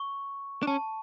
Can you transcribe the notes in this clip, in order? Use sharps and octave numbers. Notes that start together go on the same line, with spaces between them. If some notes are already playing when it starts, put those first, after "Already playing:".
Already playing: C#6
D4
C#4 A5